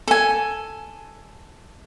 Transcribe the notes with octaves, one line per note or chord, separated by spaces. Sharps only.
A4 G#5